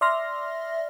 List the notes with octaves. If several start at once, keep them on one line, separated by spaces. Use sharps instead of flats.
D5 E5 C6 F6 A#6